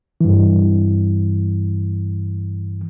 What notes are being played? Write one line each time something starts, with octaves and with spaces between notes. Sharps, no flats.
G2 E3